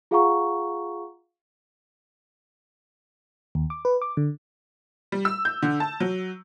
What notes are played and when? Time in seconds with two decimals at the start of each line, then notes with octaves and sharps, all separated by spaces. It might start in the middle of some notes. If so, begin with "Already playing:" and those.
0.11 F4 G#4 F5 F#5 A#5 C#6
3.55 D#2
3.70 D6
3.85 B4
4.02 D6
4.17 D3
5.12 G3
5.25 E6
5.45 G6
5.62 D3
5.80 A5
6.00 F#3